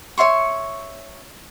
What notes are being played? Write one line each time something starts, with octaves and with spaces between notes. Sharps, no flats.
C#5 E5 C6 C#6